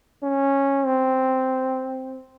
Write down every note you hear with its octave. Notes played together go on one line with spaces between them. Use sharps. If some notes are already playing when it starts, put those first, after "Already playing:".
C#4
C4